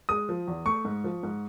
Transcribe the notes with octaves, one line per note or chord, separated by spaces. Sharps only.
G#3 D#6
F3
E2
A3 C#6
G#2
F3
G#2